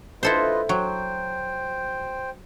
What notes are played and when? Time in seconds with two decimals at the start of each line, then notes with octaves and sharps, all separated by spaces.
0.23 E4 F4 A4 B4 C5 D#5
0.69 F#3 C5 G5